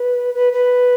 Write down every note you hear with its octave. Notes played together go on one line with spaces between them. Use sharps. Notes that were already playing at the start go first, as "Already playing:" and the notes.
Already playing: B4
B4
B4